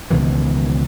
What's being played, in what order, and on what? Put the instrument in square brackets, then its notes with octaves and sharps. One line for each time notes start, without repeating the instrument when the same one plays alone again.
[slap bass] C#2 B2 D#3 E3